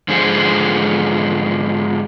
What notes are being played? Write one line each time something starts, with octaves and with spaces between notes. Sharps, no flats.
G#2 D3 F3 G#4 C5 F#5